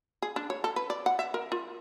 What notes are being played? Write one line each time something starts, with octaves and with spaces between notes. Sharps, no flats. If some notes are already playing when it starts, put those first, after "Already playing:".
G#4
D4
C#5
A4
B4
D5
F#5
E5
A#4
F4